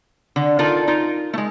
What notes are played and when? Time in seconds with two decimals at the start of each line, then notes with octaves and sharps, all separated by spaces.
0.36 D3
0.59 D#4 F4 A4 A#4 D5
0.87 D#4 F4 A#4
1.33 G#3 A3